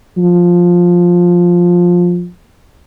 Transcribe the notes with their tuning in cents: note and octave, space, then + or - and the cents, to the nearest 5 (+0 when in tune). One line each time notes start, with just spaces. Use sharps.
F3 +10